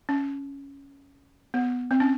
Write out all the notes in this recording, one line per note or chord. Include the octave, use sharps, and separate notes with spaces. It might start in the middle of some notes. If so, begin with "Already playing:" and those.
C#4
B3
C4
C#4